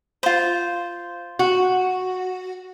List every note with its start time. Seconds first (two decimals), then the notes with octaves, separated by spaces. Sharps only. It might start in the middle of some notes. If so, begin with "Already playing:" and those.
0.23 F4 C5
1.39 F#4